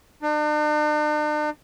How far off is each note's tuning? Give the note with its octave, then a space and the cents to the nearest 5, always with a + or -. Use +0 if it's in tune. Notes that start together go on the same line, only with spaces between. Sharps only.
D4 +45